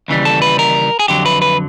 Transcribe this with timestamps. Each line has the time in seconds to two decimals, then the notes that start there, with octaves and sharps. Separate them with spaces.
0.08 D#2 C#3 E3 G3
0.25 A4
0.42 B4
0.59 A#4
0.99 G#4
1.08 F2 D3 F#3 G4
1.26 B4
1.42 B4